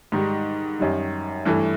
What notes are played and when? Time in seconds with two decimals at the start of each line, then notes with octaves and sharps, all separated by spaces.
0.12 G#2 D#3 G3
0.79 F#2 D#3 G3
1.46 G2 E3 A3